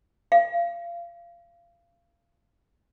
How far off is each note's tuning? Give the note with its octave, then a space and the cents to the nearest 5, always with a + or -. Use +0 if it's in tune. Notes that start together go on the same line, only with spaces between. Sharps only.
F5 -25